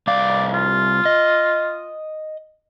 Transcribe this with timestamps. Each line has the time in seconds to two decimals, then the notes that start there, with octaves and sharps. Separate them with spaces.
0.07 C2 D5 F5
0.54 F4
1.05 D#5